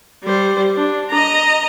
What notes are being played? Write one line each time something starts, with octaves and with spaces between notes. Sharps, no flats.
G3 C5
D4
D#5 A#5